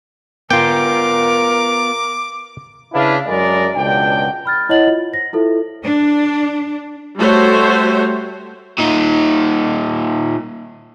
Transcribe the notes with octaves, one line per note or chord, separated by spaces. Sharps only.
B3 F4 A#4 G5 D6
C#3 D4 E4 B4 F5
F#2 D3 G#3 A#4 D5
C#2 F#2 B2 D4 G5
B5 F6 A6
E4 C#5 D#5 F#5 A6 F#7
F4
C5 A#6
E4 F4 A4 C5 E5
D4
G3 A3 F#4 C5 C#5
A#2 D#4